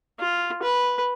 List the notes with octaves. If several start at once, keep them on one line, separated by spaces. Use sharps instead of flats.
F4
B4